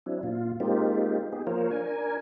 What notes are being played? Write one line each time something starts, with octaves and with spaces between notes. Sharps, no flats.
F#3 C4 D4 E4
A#2 F4
G#3 A#3 C4 D#4 F4 G4
B3 D#4 G4 G#4
F3 A#3 F4 A#4 C5 C#5
D4 A#4 G#5